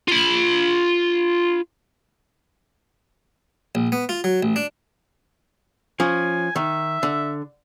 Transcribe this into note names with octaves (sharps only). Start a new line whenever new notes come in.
F4 B5
A#1
B3
F4
F#3
A1
D4
F3 C#4 G#5
D#3 E5
D3